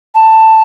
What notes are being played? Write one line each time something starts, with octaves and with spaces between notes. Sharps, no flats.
A5